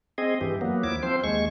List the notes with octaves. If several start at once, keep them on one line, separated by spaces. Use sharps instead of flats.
C4 G#4 D#5
G2 E3 G4
F#3 A#3 B3
D#2 F3 E4 D6
F3 C4 C5
D#2 G#3 C#6